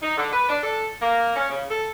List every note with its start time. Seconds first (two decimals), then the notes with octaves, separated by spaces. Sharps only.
0.02 D#4
0.17 D3
0.32 B4
0.49 D4
0.61 A4
1.01 A#3
1.35 C#4
1.49 C#3
1.70 A4